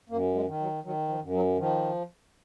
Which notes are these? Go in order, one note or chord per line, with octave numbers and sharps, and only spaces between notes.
F#2 A#3
G#3
D#3
F#3
D#3 F#3
F3
F#2
F#3
D#3 F3